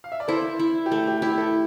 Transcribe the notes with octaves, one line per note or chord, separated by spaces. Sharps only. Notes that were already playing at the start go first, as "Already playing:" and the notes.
F5
E5
D5
E4 A4 C5
E4
G4
A3 A4
G4
E4 G4
A4